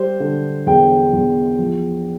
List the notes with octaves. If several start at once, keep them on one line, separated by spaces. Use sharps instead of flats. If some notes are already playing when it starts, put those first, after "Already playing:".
Already playing: G3 C5
D3
E2 G5
E2
F3